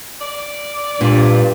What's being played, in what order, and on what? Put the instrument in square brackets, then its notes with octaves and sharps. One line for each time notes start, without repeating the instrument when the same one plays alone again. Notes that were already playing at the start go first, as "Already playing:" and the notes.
[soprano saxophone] D5
[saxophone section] G2 [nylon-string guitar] A#2